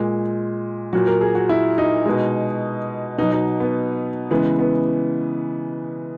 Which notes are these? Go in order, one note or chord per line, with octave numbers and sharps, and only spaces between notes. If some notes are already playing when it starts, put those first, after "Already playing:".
Already playing: A#2 G#3
A#2 F#3 F#4
A#4
G#4
F#4
E4
D#4
B2 G#3
B2 F#3 D#4
D#4
B3
C#3 E3 G#3 B3
B3